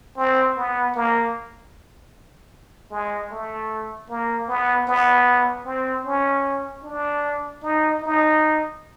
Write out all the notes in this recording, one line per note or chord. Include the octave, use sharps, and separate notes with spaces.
C4
B3
A#3
G#3
A3
A#3
B3
B3
C4
C#4
D4
D#4
D#4